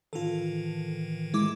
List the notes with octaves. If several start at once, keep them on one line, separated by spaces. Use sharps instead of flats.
A2 D#3 E3 F4 A4
G#3 E4 D6